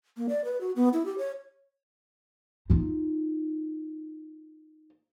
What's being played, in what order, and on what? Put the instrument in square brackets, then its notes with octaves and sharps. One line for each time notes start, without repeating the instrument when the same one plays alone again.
[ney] A#3
D5
B4
F#4
B3
E4
G4
C#5
[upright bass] D#4 F4